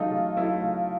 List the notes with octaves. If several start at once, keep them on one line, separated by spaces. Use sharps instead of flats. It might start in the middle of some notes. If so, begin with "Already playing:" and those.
Already playing: C#3 F#3 A3 D#4 F4
C#3
F#3 A3 E4
C#3